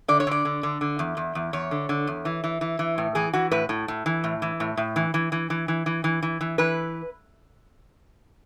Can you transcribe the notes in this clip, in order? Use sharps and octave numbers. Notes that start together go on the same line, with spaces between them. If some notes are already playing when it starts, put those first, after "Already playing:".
D3 D5
C#5
D3 D5
D3
D3
D3
E2
E2
E2
E2 C#5
D3
D3
E2
E3
E3
E3
E3
A2
E3 G#4
E3 F#4
A2 B4
A2
A2
E3
A2
E3
A2
A2
E3
E3
E3
E3
E3
E3
E3
E3
E3
E3 B4